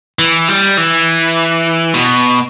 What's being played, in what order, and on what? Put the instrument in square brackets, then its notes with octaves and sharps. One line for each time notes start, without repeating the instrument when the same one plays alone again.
[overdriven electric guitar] E3
G3
E3
B2